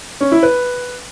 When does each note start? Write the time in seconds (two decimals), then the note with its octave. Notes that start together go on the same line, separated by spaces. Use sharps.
0.21 C#4
0.32 E4
0.43 B4